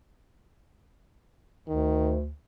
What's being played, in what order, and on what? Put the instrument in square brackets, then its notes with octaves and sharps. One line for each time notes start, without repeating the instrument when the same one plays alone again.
[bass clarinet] D2 [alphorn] D#3